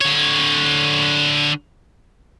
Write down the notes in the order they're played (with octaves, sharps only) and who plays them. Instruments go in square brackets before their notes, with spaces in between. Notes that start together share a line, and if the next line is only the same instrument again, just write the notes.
[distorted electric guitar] D3 C#5